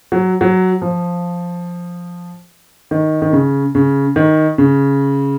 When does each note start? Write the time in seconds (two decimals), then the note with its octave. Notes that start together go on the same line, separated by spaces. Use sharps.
0.12 F#3
0.41 F#3
0.82 F3
2.91 D#3
3.22 D#3
3.32 C#3
3.75 C#3
4.16 D#3
4.58 C#3